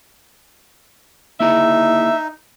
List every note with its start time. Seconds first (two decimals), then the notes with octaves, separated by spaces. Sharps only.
1.40 A#3 D#4 E4 G#4 E5